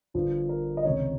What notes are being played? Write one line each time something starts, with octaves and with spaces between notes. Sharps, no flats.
G1 G2 F3
A#4
D#5
C#2 C3 D#3 C#5